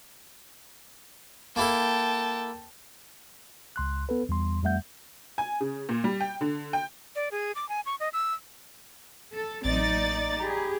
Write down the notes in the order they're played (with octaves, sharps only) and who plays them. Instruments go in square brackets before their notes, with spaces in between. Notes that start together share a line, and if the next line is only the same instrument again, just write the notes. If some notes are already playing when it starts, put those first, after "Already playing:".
[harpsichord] A#3 E4 A4 [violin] G5 A5
[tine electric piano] C#2 C6 F#6
B3 A4 B4
E2 G3 C6
F2 G3 A3 E5 F#5 G6
[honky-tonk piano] G#5
C#3
A#2
G3
G5
D3
G5
[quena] D5
G#4
D6
G#5
C#6
D#5
E6
[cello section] A4
[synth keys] A1 [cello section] F#3 C4 [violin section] D#4 D5 A6
[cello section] A#3
[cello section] G4 G#4 [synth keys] A#5 B5